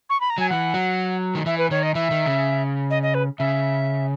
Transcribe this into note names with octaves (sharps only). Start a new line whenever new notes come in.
C#6
B5
A#5
F#3 G#5
E3 F#5
F#3
D#3
E3 E5
B4
D#3 C#5
D#5
E3 E5
D#3
C#3
D#5
D#5
B4
C#3 E5